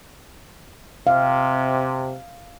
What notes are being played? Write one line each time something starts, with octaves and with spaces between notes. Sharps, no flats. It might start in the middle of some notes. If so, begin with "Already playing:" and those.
C3 F5